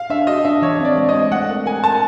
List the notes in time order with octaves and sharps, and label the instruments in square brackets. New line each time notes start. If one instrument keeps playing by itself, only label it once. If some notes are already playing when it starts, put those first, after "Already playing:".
Already playing: [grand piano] F5
[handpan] D4 [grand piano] E5
[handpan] F#4 [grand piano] D#5
[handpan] D4 [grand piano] E5
[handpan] E3 [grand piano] C#5
[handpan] C4 [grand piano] D5
[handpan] G#3
[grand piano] D#5
[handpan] C4
[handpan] A3 [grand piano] F#5
[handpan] A#4
[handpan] A#4 [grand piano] G#5
[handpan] A#4 [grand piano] A5